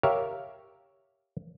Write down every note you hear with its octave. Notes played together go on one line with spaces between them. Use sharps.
G4 A#4 C#5 E5 F5